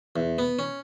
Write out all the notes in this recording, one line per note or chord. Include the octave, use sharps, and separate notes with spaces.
E2
B3
C#4